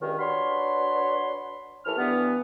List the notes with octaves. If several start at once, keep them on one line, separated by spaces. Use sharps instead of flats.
C#2 G2 D#3
D4 F#4 B4 C#5 B5 C6
D#2 E3 A3 A4 F6
G2 E3 B3